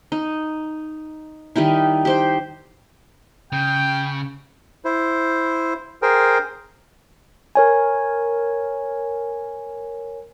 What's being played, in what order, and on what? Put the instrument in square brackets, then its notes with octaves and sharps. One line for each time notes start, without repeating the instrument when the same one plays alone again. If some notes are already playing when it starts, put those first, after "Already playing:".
[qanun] D#4
D#3 G3 D#4 E4
G4 C5 G5
[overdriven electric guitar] C#3 [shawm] G5
[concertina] E4 C5
G#4 A#4 C5 G5
[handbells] A#4 C#5 G#5